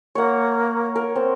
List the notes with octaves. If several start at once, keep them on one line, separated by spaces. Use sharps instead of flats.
A#3 C#5 F#5
A#4
C4